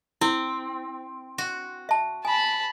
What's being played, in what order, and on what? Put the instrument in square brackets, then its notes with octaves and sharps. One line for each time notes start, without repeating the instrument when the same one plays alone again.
[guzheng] C4 [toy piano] E4
[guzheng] F#4
[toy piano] E5 A5
[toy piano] G#5 [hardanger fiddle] A5 B5